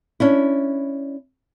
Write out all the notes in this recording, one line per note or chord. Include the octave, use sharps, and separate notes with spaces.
C#4 D4 E4